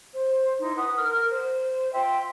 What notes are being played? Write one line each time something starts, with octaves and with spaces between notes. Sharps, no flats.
C5
D#4 E4 C6
B4 F#5 D#6
A#4 F6
C5
F4 E5 G5 C6